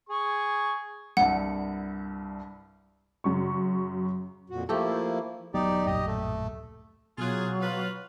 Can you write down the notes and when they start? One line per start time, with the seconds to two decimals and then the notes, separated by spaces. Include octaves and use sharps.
0.09 G#4 C#6
1.17 C2 G2 F#5
3.24 F#2 C#3 C#6
4.50 F2 A#2 F#4
4.69 F3 A3 A#3 E4 G4 A4
5.54 D#1 F#3 B3 D#4 G4 D5
5.86 D1 A#1 F#2 G4 D#5
6.07 A3
7.18 B2 F#3 F4 G#4 F6 F#6
7.61 F4 B4 F5